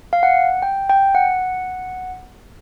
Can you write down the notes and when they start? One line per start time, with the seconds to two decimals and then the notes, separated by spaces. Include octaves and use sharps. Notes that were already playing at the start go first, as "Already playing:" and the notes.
0.13 F5
0.23 F#5
0.62 G5
0.89 G5
1.15 F#5